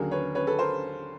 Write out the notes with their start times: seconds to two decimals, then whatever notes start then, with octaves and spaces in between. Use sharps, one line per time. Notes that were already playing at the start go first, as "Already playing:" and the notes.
Already playing: D#2 D3 F#3 G#4 A#4
0.11 B4 C#5
0.35 B4 C#5
0.47 A4 B4
0.59 A#4 C5